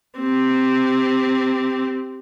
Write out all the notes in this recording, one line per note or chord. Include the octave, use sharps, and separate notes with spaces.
C4 G4